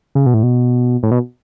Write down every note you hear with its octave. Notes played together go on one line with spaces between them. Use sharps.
C#3
B2
A2
B2
A2
B2